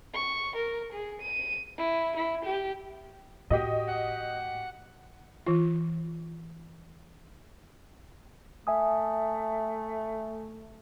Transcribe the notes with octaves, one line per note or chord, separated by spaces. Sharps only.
C#6
A#4
G#4
D#7
E4
E4
G4
A2 F#4 G4 D#5
F#5
E3 F4
A3 E5 G#5 D#6